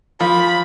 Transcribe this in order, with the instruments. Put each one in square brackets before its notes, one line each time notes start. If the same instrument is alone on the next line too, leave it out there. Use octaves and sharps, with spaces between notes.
[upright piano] F3 [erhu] B5